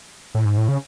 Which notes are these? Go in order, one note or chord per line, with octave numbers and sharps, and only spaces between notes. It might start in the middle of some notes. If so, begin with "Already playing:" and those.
A2
G#2
A2
C#3